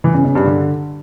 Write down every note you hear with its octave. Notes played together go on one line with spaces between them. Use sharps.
E3
C#3
C#3
G2
D3